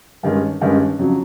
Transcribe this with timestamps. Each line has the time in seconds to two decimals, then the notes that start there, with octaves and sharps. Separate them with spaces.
0.23 G2 D#3 G#3 C#4
0.61 G2 D#3 G#3 C#4
0.99 F2 C#3 F#3